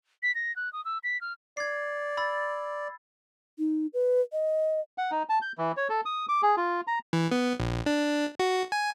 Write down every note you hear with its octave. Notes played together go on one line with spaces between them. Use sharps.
B6
A#6
F#6
D#6
E6
B6
F6
D5 G#6 C7
B5 E6 A6
D#4
B4
D#5
F#5
D#4
A5
G6
E3
C#5
A4
D#6
D6
G#4
F4
A#5
E3
B3
A#1
D4
F#4
G#5